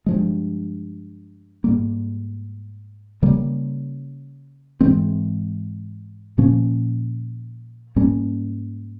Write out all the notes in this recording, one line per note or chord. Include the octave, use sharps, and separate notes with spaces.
G2 F3 G#3
G#2 G3 A#3
C#3 G3 A#3
G#2 E3 G#3 C4
A#2 F3 A#3 C#4
G#2 G3 A#3 C#4